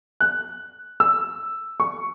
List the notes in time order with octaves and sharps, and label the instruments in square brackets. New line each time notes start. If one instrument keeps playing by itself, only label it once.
[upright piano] F#6
E6
C#6